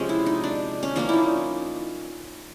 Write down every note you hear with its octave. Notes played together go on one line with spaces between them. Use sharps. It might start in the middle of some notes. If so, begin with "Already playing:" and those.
Already playing: C3 F3 G#3 C#4
E4
D#4
D4
C#4
F3 A#3 C#4 D4
D#4 E4